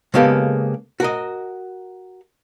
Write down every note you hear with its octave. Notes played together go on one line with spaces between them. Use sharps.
C#3 G#3 A#3 B3 G4 A4
F#4 A#4 D#5